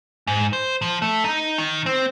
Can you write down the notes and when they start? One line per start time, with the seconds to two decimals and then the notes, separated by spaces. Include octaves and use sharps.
0.27 G#2
0.53 C5
0.82 F3
1.02 A3
1.24 D#4
1.58 D#3
1.86 C4